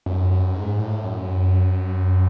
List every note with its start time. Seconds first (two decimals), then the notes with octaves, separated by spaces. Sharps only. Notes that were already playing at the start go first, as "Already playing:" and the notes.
0.06 F#2
0.31 F#2
0.54 G#2
0.79 A2
1.03 F#2